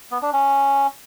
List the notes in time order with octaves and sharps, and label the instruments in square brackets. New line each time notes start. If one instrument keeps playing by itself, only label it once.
[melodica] B3
D4
C#4